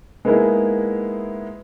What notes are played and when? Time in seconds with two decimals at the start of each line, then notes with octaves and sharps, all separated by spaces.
0.25 G#3 A#3 B3 D#4 E4 G#4